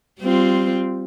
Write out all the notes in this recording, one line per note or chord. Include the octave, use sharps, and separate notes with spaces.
G3 C4 F4